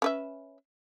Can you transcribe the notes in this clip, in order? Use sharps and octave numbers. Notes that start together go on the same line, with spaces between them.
C#4 B4 E5